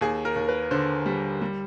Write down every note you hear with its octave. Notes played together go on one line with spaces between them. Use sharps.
D#2 G#4
A#4
D#2
B4
D3 C5
G3
G3